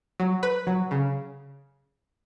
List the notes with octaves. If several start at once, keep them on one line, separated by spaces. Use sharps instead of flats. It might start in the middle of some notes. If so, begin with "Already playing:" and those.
F#3
B4
F#3
C#3